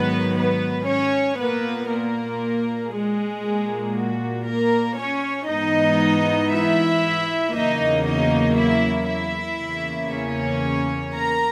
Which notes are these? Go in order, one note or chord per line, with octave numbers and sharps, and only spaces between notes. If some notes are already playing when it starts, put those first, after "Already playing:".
Already playing: G#2 D#3 F#3 B3 B4
B3 B4
C#4 C#5
A#2 A#3 B3 B4
A#3 A#4
G#3 G#4
A#2 A#3
F#4
A#3 A#4
C#4 C#5
G#2 E3 B3 D#4 D#5
E4 E5
E2 C#3 F#3 A#3 D#4 D#5
D#4 D#5
E4 E5
E4 E5
E2 C#3 E3 A#3
C#4 C#5
A#4 A#5